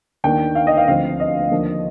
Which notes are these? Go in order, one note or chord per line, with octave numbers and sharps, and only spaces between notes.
D#2 D#3 A#3 D4 G5
F5
D#5
F5
D2 D3 F3 C4 F5
D#5
D#2 D3 F3 A#3 D4